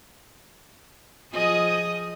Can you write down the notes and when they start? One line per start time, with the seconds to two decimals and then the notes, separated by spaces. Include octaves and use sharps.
1.33 F3 G#4 D#5